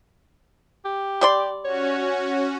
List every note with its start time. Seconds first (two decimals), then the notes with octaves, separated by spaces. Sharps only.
0.85 G4
1.21 G3 D5 C6
1.65 C#4 F#4 C#5